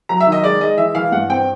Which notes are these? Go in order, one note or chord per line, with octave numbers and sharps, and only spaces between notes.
F#3 A#5
E5
D#3
D#5
G#3 D5
G#3 D#5
E3 E5
E3 F5
G2 F#5
C4 G5